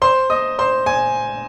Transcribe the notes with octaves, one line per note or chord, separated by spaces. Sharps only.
C5 C6
D#5 D#6
C5 C6
G#5